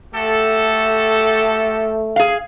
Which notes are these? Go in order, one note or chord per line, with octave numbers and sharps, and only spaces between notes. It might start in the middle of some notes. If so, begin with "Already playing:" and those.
A3 F#4 G4 A4
G#4 F5